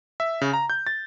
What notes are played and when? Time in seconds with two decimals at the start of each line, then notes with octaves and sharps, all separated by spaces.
0.20 E5
0.41 C#3
0.53 A#5
0.70 G6
0.87 A6